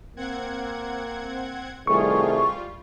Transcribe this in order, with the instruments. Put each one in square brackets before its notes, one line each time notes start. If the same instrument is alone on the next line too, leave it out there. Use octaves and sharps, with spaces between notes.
[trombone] A#3 [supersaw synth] C4 F#5 G#6
[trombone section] C2 D#3 A3 [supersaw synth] G3 F4 [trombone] G#4 [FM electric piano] C#6